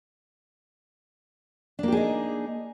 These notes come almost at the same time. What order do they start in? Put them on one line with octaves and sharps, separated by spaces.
D4 A#3 G4 G#4 D#4